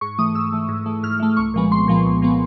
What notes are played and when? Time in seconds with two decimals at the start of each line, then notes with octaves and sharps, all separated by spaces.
0.01 G#2 C#6
0.19 E3 A3 D#6
0.35 G#2 E6
0.53 E3 A3
0.69 G#2
0.86 E3 A3
1.03 G#2 F6
1.20 E3 A3
1.37 C2 C#6
1.54 A#2 F3 G#3 B3
1.71 C2 C6
1.88 A#2 F3 G#3 B3
2.06 C2
2.22 A#2 F3 G#3 B3